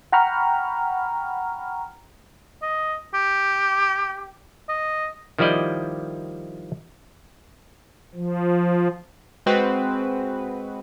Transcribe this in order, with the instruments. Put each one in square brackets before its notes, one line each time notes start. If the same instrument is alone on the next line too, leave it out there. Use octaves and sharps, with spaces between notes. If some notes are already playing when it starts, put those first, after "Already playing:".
[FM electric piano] F#5 G5 A#5 B5 C#6 F6
[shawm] D#5
G4
D#5
[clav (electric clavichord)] D#3 F3 G3 E4 D5 D#5
[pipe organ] F3
[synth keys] G#3 C4 F#4 B4